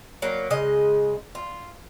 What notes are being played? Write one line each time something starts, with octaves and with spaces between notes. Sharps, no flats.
F#3 A#3
C#3 G#3 D#5
F4